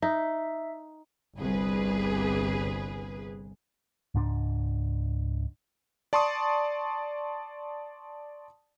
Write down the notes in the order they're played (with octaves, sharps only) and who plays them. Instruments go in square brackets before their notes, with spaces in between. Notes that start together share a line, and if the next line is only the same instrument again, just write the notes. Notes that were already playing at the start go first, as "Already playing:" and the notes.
[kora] D#4 [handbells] E5
[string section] G1 C2 G#4 B4
[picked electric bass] C#2 G#2 D4
[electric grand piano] D5 A5 C6 C#6 D#6